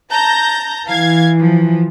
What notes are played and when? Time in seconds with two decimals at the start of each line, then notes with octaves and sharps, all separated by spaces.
0.10 A5 A#5 G6
0.88 E3 F5 G#6
1.39 F3